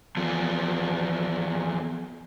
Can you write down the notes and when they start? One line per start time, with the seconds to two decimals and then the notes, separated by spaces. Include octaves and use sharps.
0.17 E2 F3